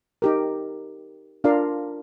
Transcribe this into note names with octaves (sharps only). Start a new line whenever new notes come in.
D#4 G4 A#4
D4 F4 A#4 D5 F5